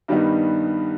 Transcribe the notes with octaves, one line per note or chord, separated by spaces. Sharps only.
G2 D#3 G3 B3 D#4